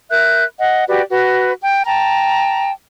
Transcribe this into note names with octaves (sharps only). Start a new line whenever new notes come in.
A#4 E5 F#6 G6
D#5 F#5
F#4 G4 B4 D5
F#4 B4
G5
G5 A5 A#5